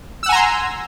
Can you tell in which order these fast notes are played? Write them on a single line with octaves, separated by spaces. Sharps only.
E6 F#5 G#5 A#5 C6